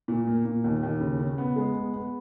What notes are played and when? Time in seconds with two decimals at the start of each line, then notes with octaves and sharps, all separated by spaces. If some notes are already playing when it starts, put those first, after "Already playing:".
0.08 A#2
0.27 A#3
0.45 A#2
0.64 D#2
0.83 D#2
1.01 C#3
1.20 C#3
1.38 B3
1.56 G#3
1.75 B3
1.94 B3